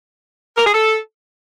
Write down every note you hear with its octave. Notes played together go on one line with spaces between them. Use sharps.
A#4
G#4
A4